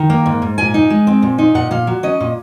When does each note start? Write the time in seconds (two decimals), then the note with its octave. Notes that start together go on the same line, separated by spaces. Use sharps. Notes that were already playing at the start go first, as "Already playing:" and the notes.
Already playing: D#3 A#5
0.10 A#3
0.26 G#2
0.42 G#2
0.58 A#2 G#5
0.74 D#4
0.90 G#3
1.07 C4
1.22 A#2
1.38 D#4
1.55 A#2 F#5
1.71 A#2 F5
1.87 F#3
2.03 C#4 D#5
2.20 A#2